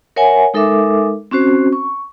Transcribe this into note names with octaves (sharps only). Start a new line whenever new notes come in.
A#4 C#5 E5 F#5 G#5
G#3 D#4 A4 A#4 E5 D6
C4 C#4 F#4 C5
C#6